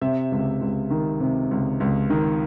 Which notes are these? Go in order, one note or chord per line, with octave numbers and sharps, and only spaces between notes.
C3 E5
C#2
C#2
D#3
C3
C#2
C#2
D#3